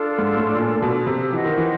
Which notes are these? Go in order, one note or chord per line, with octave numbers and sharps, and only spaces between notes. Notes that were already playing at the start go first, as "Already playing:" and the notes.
Already playing: D4 F4 A4
G#2
A2
A#2
B2
C3
E3 C5 D#5 F#5
D#3
E3